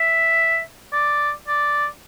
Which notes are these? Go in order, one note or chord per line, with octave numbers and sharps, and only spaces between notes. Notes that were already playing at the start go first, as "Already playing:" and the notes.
Already playing: E5
D5
D5